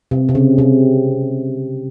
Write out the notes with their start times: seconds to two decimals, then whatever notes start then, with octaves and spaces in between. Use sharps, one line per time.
0.11 C3
0.29 C3
0.35 C#3
0.58 C3